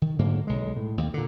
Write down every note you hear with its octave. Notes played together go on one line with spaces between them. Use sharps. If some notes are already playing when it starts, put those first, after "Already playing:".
D#3
G#2 D3 F#3 A#3
B1 G#3
A2
D#2
A#2 D3